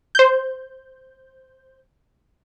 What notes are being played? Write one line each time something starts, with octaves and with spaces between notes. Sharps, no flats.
C5 G6